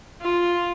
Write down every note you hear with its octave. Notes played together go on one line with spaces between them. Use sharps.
F4